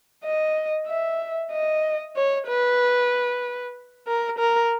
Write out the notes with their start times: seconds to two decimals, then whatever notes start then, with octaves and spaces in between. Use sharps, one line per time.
0.24 D#5
0.87 E5
1.52 D#5
2.16 C#5
2.48 B4
4.07 A#4
4.39 A#4